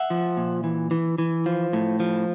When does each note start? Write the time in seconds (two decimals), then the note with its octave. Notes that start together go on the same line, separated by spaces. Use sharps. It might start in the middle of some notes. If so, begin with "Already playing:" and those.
Already playing: E5 F#5
0.10 F3
0.37 A#2
0.64 E3
0.91 E3
1.18 E3
1.46 F3
1.73 A2
2.00 F3